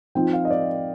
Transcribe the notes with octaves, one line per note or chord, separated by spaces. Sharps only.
F3 C4 D#4 G5
F5
D#5
D5